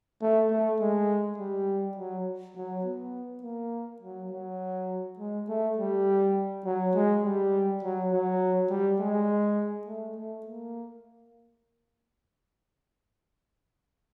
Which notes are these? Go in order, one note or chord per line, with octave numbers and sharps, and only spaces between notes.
A3
A3
G#3
G3
F#3
F#3
B3
A#3
F#3
F#3
G#3
A3
G3
F#3
G#3
G3
F#3
F#3
G3
G#3
A3
A3
A#3